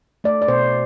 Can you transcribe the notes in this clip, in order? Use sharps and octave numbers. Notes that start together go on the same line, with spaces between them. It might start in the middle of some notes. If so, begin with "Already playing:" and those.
A3 D5
D5
B2 C5